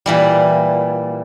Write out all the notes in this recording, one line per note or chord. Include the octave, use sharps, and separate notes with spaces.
A#2 E3 G3